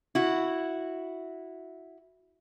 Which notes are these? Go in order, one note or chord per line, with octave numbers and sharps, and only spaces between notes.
E4 F#4